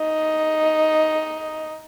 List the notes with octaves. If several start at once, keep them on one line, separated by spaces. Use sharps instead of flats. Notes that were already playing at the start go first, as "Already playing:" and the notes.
Already playing: D#4